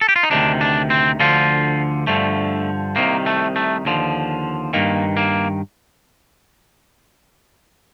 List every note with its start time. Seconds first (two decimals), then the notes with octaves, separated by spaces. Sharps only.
0.01 A4
0.09 G4
0.16 F4
0.23 D#4
0.31 D2 C3 D#3 D4
0.61 D4
0.90 C4
1.19 D2 D3 F3 F4
2.07 G2 D3 F3 A3
2.96 C2 C3 D#3 A#3
3.26 A3
3.56 A3
3.85 D#2 D3 F3
4.73 G2 D#3 A#3
5.17 A#3